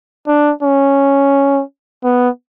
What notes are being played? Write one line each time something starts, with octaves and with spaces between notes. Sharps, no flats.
D4
C#4
B3